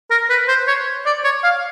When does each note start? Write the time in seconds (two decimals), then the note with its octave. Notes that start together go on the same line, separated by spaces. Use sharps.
0.10 A#4
0.29 B4
0.48 C5
0.67 C#5
1.06 D5
1.24 C#5
1.43 F5